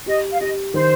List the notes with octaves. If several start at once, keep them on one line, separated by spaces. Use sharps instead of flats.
G4 D#5
F5
G4 D#5
D#3 C5